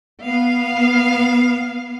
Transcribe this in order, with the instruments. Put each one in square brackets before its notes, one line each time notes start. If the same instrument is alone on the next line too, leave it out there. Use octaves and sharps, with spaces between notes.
[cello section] B3 F5